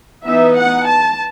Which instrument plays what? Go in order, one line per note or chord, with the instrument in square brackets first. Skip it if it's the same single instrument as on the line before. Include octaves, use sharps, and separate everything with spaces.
[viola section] E3 B3 D#4 E5
F#5
A5